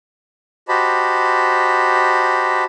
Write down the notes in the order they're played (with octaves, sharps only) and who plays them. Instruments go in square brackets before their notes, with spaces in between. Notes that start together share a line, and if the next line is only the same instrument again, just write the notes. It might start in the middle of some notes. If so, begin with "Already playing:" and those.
[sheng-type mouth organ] F#4 G4 C5 D#5 A5 B5